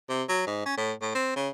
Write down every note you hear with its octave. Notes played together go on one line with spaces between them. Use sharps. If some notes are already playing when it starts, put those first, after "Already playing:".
C3
F#3
G#2
C#4
A2
A2
C4
C#3